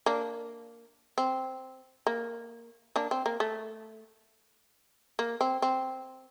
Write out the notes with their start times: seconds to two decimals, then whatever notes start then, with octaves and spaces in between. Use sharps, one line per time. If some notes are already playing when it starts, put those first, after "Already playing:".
0.06 A#3 D4
1.18 C4
2.07 A#3
2.96 A#3 D4
3.11 C4
3.26 A#3
3.40 A3
5.19 A#3
5.41 C4
5.62 C4